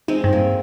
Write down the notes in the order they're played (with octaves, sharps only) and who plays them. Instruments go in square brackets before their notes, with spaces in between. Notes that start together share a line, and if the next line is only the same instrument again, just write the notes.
[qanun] G#3 C4 [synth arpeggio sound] D#4
[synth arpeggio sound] G2
[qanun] A#3